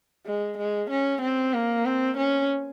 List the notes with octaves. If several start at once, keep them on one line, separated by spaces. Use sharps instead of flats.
G#3
G#3
C#4
C4
A#3
C4
C#4